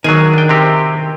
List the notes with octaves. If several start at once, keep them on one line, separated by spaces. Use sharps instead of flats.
D#3 F#3 G#4 G#5
D4 G5
C3 C4 G4